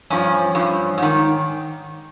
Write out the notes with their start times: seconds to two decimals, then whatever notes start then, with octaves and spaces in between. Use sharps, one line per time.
0.10 G2 F3 C#4
0.55 G2 F3
0.98 G#2 D#3